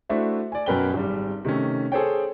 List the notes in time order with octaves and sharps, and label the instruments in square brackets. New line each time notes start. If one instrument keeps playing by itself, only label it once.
[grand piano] A3 D4 E4 F#4 C5 E5
D5 G#5
F#2 B2 A#4 B4 G5 G7
G#1 G3
C3 D#3 A3 C#4
G#4 A4 C5 C#5 G5